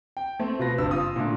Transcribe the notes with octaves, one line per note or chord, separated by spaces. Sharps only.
G5
A3 C4
B2 F4 B4 A#6
F#1 G2 C4 E6
F4 D#6
A#2 D3 A3